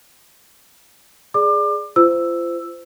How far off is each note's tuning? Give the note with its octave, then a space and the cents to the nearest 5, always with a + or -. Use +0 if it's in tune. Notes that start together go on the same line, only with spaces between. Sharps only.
G#4 +0 D5 +0 D6 +30
F4 -30 C5 -25 E6 +0